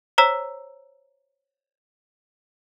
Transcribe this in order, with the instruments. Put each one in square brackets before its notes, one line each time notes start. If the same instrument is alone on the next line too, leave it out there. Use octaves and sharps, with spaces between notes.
[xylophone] C5 C#5 A#5 E6 B6